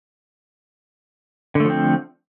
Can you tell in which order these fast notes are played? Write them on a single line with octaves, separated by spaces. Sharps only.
D3 A3 F3 C4